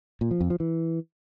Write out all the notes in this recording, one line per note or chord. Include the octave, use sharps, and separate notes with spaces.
A#2
F3
F2
F3
E3